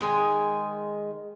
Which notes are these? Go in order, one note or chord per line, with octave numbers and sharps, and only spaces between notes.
D#3 G#3 G#5